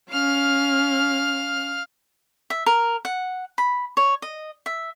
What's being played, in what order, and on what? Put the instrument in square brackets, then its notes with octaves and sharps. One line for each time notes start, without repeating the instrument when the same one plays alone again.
[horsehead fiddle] C#4 [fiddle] F5 F6
[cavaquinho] E5
A#4
F#5
B5
C#5
D#5
E5